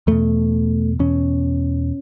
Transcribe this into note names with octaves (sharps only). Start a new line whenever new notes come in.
E2 B2 A3
E2 B2 C#4